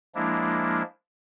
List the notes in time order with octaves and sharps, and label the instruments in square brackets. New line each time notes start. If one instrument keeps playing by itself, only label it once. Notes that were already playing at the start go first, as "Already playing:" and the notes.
[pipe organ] F3 G#3 A#3 D4 E4